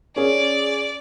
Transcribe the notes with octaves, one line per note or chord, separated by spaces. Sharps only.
C#4 G#4 D5